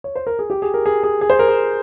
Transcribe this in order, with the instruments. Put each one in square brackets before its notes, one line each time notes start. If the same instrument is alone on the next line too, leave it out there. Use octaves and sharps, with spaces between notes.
[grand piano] C#5
C5
A#4
G#4
G4
G#4
A#4
G#4
G#4
G#4
C5
A#4
G#4